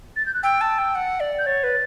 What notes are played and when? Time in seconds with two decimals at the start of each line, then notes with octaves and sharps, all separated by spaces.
0.16 A6
0.26 G6
0.34 F#6
0.43 G5 E6
0.61 A5
0.78 G5
0.95 F#5
1.20 D5
1.39 G6
1.46 C#5 A6
1.64 B4